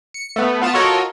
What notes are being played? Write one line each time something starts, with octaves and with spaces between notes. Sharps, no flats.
C#7
A3 B3
B3 F4 A5
F4 F#4 A4 A#4 C#5 D#5